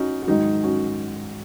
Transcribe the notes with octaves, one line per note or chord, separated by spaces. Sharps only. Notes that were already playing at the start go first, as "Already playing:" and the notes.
Already playing: C#4 D#4 F#4
F#4
G#2 D#3 F#3 D#4
C#4 F#4